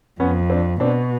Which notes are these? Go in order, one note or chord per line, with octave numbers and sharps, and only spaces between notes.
F2 B3 C#4
C4 D4
B2 C4 D4